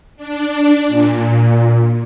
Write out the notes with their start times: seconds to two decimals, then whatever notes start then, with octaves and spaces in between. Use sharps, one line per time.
0.17 D4
0.87 A#2